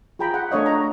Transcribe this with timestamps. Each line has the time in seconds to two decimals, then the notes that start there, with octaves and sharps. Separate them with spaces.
0.19 F4 G#4 G5 A#5 B5
0.34 F#5
0.51 A3 D4 C#5 D#5 F5
0.66 A#5